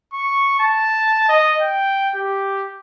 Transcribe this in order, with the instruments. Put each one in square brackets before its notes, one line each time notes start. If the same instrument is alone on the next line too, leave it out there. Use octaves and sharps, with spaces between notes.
[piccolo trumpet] C#6
A5
D#5
G5
G4